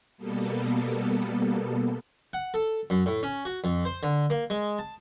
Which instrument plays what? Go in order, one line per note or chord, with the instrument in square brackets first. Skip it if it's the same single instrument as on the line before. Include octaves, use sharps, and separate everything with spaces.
[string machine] B2 G3 A#3 B3 A4
[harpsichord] F#5
A4
F#2
A2
C#4
F#4
F2
C5
D3
A#3
G#3
A5